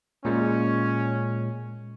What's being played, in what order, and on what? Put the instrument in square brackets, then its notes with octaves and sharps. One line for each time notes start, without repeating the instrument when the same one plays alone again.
[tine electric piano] A#2 G#3 [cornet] C#4